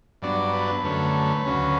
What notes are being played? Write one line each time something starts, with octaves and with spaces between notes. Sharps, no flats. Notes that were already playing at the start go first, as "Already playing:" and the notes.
G2 F#3 B3 D4 D5
B4
F#2 D3 A3 C#4 B4
D2 C#3 F#3 C#4